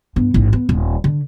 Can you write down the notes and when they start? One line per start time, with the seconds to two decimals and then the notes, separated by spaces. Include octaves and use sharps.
0.16 G2 B3
0.34 A1 G#2
0.53 B3
0.69 D#1
1.04 D3